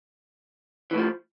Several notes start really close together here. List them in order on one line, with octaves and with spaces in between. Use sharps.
E3 A2 F3